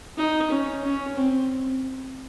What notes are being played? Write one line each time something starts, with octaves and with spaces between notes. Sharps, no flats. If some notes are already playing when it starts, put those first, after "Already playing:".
D#4
C#4
C#4
C4